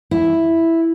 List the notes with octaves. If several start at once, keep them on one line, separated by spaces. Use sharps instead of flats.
E4